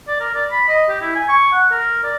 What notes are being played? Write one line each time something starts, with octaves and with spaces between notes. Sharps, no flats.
D5
A#4
D5
B5
D#5
G4
E4
G#5
C#6
F#5
A#4
D5